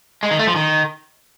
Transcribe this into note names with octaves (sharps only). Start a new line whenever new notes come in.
G#3
D#3
A3
F3
D#3